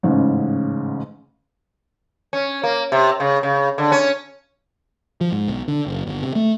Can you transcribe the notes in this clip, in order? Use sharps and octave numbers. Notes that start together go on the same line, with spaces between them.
A1 G#2 C#3
C#4
A#3
C3
C#3
C#3
D3
C#4
F3
G#2
B1
D3
F#1
G1
C3
A3